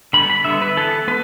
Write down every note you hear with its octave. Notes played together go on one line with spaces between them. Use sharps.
D3 G3 B3 B5
B5
D3 G3 B3 E5
B4
E3 B3 A4
B3 B4